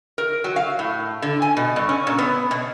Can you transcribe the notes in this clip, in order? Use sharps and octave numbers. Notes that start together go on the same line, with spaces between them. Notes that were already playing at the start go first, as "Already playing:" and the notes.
A#4
F#3
F5
A2
D3
G#5
B2
G2
C#4
A#2
B3
B2